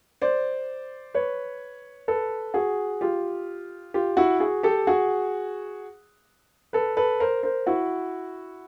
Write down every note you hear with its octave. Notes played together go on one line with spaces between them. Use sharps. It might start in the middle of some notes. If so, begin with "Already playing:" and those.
C5 D5
B4 C#5
A4 B4
F#4 G#4
F4 G4
F4 G4
E4 F#4
F#4 G#4
G4 A4
F#4 G#4
A4 B4
A4 B4
A#4 C5
A#4 C5
E4 F#4